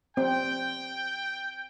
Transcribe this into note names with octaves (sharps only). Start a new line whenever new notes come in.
C4 G5